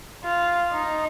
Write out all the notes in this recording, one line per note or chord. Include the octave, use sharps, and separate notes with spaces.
F4
D#4